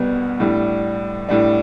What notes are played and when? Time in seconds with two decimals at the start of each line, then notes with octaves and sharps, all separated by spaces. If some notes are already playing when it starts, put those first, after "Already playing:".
Already playing: C2 B2 G3 B3
0.40 A2 G3 D4
1.29 A2 G3 D4